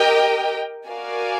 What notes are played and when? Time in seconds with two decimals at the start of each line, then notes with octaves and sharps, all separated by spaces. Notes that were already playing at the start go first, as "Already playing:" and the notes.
Already playing: G4 A#4 D#5 G5
0.87 F#4 A#4 D5 F5 G#5